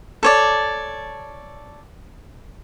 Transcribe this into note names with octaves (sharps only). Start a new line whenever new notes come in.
A4 C#5 D5